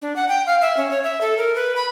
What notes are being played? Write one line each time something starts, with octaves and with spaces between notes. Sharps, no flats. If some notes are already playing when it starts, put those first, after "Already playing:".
D4
F#5
G5
F5
E5
C#4
C#5
E5
A4
A#4
B4
B5